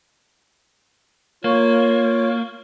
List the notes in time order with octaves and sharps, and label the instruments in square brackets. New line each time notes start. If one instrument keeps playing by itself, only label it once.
[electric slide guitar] A#3 [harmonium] F4 C#5